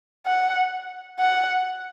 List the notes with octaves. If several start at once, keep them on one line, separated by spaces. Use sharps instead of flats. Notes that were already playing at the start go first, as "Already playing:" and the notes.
F#5
F#5